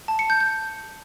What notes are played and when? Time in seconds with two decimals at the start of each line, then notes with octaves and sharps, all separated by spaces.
0.08 A5
0.19 C#7
0.30 G6
0.40 G6